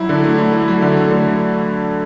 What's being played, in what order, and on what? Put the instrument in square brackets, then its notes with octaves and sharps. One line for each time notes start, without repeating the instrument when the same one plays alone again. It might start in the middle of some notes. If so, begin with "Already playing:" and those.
Already playing: [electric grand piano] F#3 E4
D3
A3
E4
A3
F#3
D3
A3
D3